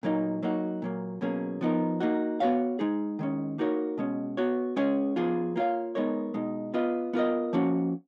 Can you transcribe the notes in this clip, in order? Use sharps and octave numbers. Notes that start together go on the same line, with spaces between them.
A#2 F#3 A#3 D#4
F#3 A#3 D#4 F#4
A#2 F#3 A#3
B2 F#3 A#3 C#4 G#4
F3 B3 D#4 A#4
A#3 D#4 F#4
B3 F#4 C#5 F5
G#3 D#4 G#4
D#3 G#3 C#4
A#3 D#4 F#4 A#4 C#5
B2 G#3 C#4
B3 F#4 C#5
G#3 C#4 G#4 C#5
F3 B3 F4 G#4
A#3 F4 A#4 C#5 F5
G#3 B3 D#4 A#4 C#5
B2 G#3 D#4
B3 F4 B4 D#5
B3 F4 A#4 D#5
F3 A#3 C#4 F#4